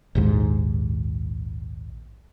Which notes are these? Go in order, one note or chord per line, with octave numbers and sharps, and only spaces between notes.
A#1 D#2 G#2